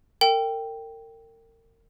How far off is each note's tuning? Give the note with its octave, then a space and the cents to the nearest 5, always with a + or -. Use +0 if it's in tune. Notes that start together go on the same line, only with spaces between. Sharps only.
A#4 -35 G5 +0